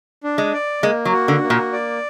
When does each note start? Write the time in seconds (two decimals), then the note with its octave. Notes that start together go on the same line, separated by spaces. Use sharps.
0.24 D4
0.38 G#3
0.53 D5
0.83 G#3 A#3
1.05 F#3
1.12 F#4
1.28 D3
1.43 A#3
1.50 A#2
1.73 D5